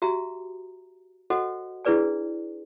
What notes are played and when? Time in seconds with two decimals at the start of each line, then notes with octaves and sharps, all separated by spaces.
0.02 F#4 G4 E5 A#5
1.30 F#4 A4 C5 D#5 F#5
1.85 D4 E4 G#4 B4 D5 G#5